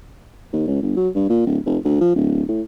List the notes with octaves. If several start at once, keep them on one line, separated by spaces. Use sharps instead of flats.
D#2
C#2
G1
F#3
G2
A#2
D1
F1
D2
F3
D1
A2